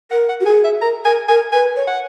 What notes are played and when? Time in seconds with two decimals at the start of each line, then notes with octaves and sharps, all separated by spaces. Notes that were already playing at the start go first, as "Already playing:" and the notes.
0.11 A#4 F#5
0.29 F#5
0.40 F#4
0.46 G#4 G#5
0.64 E5
0.82 A#4 A#5
1.05 A#4 G#5
1.28 A#4 G#5
1.52 B4 G#5
1.76 C#5
1.87 F#5